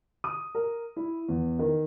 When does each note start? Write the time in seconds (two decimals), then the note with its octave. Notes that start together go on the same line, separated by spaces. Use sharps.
0.24 D#6
0.55 A#4
0.96 E4
1.28 E2
1.59 D#3